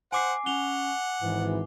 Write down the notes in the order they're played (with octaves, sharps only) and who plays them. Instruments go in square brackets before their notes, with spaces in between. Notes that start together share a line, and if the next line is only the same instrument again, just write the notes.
[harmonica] C5 F#5 [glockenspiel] G#5 D6 C7
[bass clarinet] C#4 [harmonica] F#5 [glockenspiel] F7 G7
[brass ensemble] G#1 E3 [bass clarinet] G#2